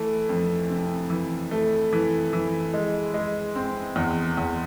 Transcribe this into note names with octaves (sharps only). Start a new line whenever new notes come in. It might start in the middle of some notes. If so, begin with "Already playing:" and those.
Already playing: E3 A3
F2
C3
E3
A3
E3
E3
G#3
G#3
C4
E2
E2